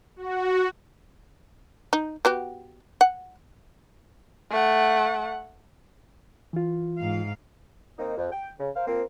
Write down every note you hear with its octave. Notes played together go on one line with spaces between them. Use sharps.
F#4
D#4
B3 F#4 G4
F#5
A3 F#5
E3 F4
G#2 F5
D#3 A#3 C4 D#4
F2
G5
C#3
A#4 C5 F5
F3 A#3 C4